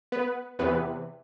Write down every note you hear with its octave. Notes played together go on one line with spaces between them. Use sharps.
B3 B4
E2 C3 E3 B3 B4